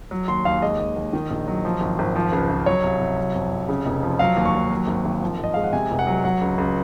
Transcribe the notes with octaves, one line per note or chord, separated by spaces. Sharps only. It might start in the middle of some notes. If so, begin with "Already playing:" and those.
F#3
D#2 C6
D#2 F5
G#3 D#5
D#2
D#2
D#3
A#1
F#3
F3
G#1
G#1
F3
C#2
C#2
F#3 C#5
C2
C2
F#3
F2
F2
C#3
F1
F3
F#3 F5
D#2
C#6
D#2
F#3
G#1
G#1
F3
G#1 D#5
G#3 F5
F#5
C3 G#5
F1
F#5
F#3
F#3 F#5
C#2
C#2